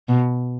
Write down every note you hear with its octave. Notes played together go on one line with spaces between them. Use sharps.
B2